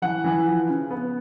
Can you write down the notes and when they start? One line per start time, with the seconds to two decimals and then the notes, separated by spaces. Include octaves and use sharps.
0.02 E3 F#5
0.24 E3
0.46 F3
0.69 C#3
0.91 B3